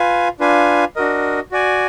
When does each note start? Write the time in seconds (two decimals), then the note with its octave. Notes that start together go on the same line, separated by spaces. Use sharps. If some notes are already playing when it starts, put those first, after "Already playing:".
Already playing: F4 B4 F5 G#5
0.40 D4 F4 B4 F5 G#5
0.96 D4 F#4 A#4 D#5
1.51 F#4 D5 G#5